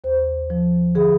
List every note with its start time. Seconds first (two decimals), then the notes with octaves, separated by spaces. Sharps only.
0.04 D#2 C5
0.50 F3
0.95 D3 G#4